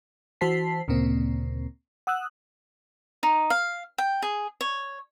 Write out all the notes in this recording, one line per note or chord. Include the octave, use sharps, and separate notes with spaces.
E3 F#4 C5 A5 B6 C7
D2 A#2 C#3 A#3 C4
F#5 D#6 E6 F#6
D#4
F5
G5
G#4
C#5